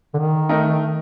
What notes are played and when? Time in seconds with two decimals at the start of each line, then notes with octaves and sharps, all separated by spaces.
0.14 D3
0.18 D#3
0.49 A3 D#4 A#4 D#5